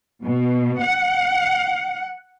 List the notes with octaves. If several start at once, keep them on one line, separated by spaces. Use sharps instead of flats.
B2
F#5